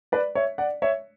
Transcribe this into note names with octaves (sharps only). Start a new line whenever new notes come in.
B4 D5
C#5 E5
D5 F#5
C#5 E5